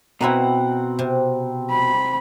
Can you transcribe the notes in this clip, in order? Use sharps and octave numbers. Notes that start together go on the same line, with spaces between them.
B2 C4 E4 B4 D#5 F#5 A#5
C3
B5